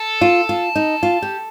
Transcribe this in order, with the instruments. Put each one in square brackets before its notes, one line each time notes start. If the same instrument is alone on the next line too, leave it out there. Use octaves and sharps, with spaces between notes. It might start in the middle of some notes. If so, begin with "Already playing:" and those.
Already playing: [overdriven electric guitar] A4
[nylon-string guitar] F4
F4
D#4
F4
G4